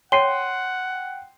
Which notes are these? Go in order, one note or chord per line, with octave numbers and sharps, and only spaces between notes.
C#5 F#5 G5 C6 C7 D#7